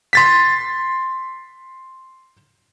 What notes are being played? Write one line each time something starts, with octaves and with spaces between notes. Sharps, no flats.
C6 A6 B6